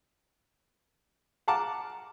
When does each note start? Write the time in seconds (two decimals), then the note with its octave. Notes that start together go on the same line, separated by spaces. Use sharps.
1.48 F5 F#5 A5 A#5 D6